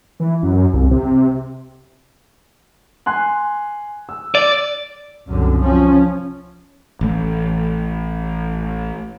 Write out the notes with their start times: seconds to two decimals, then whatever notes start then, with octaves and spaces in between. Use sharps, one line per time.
0.20 E3
0.43 F#2
0.74 C2
0.91 C3
3.06 G#5 C6 F#6
4.09 E6
4.35 D5
5.27 C2 F#2 D3
5.60 F3 C#4
7.01 A1 A3